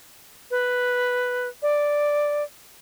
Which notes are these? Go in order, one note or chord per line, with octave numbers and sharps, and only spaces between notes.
B4
D5